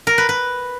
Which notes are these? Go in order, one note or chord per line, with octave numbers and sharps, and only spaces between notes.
A#4
B4
B4